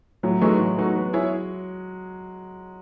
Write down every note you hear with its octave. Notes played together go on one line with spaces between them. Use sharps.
A2 F#3
E3 G#3 A3 D#4 F#4
A2
E3 A3 D#4 F#4
B3
E4 G#4 C#5